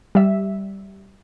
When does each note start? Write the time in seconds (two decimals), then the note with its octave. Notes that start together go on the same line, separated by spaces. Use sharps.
0.15 G3 E5